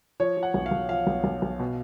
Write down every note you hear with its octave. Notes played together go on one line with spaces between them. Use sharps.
F3 C#5
F3
F#5
B1
F5
B1
F3 F5
B1
B1
B1
B2